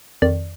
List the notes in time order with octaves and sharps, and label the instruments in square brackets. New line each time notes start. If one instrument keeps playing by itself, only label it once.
[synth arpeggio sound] F2 D#3 D5